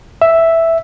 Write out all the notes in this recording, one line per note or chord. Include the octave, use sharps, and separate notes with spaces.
E5